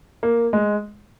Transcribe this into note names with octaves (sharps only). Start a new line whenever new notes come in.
A#3
G#3